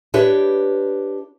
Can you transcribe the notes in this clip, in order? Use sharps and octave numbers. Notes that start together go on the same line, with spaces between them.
D4 E4 G4 B4 C#5